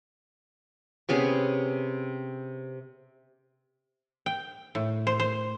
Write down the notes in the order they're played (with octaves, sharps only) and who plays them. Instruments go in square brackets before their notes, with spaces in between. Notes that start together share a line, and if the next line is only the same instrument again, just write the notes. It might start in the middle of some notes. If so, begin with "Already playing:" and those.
[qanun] C3 B3 C#4 G#4
[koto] G5
A2
C5
C5